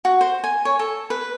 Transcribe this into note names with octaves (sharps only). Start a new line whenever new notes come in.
F#4
C5
G#5
C#5
A4
B4